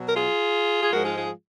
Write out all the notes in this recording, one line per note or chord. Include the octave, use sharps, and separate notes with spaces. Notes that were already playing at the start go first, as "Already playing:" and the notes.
Already playing: B2 F#3
A#4
F4 G#4
G#4
G#2 F3 G#3 F#4 A#4
F4 G#4
F4 G#4